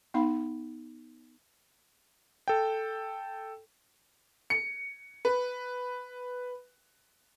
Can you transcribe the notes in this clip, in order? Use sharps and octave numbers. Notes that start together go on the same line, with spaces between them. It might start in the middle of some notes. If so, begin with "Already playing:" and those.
B3 D#4 F5 B5
A4 G5
C#7
B4